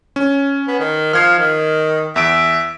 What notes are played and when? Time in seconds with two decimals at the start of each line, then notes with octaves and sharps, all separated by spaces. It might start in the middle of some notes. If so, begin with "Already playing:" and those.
0.16 C#4
0.67 B3
0.79 D#3
1.13 F3 F6 G#6 C7
1.38 D#3
2.16 E2 E5 D7